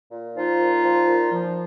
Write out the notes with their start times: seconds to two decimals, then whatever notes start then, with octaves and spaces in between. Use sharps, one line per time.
0.11 A#2
0.35 F3 D#4 F4
0.60 A#2
0.84 F3
1.07 A#2
1.32 F3